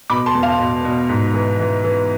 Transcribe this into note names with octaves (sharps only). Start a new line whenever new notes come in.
B2 B5 D6
A5 C6
E2
F5 A5
B2
B2
G#2
E3
E3
E3